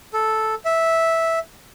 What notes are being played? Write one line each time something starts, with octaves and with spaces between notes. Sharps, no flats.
A4
E5